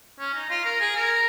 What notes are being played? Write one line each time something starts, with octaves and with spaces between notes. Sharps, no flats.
C#4
D#4
F4
A#4
G#4
A#4